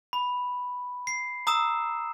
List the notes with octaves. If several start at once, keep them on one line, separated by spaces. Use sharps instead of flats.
B5
C7
A#5 D#6 E6 E7